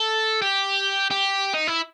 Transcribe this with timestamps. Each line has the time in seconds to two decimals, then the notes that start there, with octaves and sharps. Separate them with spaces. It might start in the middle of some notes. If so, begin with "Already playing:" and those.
Already playing: A4
0.42 G4
1.11 G4
1.54 D#4
1.67 E4